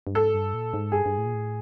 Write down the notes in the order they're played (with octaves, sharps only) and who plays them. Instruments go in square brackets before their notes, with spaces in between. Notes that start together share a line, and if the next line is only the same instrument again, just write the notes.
[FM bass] G2
[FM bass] G#2 [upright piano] A4
[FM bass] G2
A#2
G#2
[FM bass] G2 [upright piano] G#4
[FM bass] G2
A2
A#2
A2